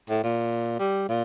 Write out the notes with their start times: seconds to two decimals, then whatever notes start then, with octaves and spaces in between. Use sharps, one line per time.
0.09 A2
0.23 A#2
0.79 G3
1.08 A#2